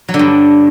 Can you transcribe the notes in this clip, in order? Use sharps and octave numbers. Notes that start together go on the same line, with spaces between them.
F#3
D3
G2